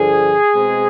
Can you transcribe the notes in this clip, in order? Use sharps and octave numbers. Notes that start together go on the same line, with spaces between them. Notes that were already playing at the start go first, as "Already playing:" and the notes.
Already playing: G2 D3 F3 G#4
B2 G#3 C4